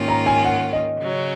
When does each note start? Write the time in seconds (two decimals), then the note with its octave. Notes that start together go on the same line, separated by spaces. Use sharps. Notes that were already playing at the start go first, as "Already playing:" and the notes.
Already playing: G#2 D#3 A#3 C#4 F4
0.08 A#5
0.26 G#5
0.45 F#5
0.73 D#5
1.00 C#3 F#3 C#4